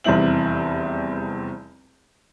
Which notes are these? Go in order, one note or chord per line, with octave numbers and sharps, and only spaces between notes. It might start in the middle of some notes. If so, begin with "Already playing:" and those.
F1 E2 G3 C4 E4 F#7